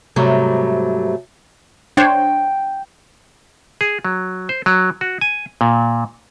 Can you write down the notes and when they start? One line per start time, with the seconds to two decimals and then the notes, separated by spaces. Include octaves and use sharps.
0.16 G#2 C3 F#3 G3 A3
1.97 D4 C5 C#5 G5
3.81 G#4
4.05 F#3
4.49 C5
4.66 F#3
5.01 F#4
5.21 G#5
5.61 A#2